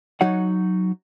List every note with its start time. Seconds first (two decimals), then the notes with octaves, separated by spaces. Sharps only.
0.21 F#3 D#4 F#4 C#5 F#5